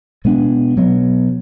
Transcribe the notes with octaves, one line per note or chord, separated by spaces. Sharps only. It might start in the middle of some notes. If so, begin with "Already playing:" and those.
B2 G#3 B3 D4
B2 F#3 B3